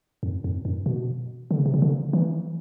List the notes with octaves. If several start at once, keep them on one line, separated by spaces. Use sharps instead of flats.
F2
F2
F#2
B2
D3
C#3
C3
C#3
D3
E3